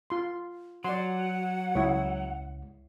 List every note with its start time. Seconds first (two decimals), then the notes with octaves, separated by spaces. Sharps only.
0.10 F4 C6
0.84 F#3 D5 F#5 C6
1.75 C#2 E4 C#5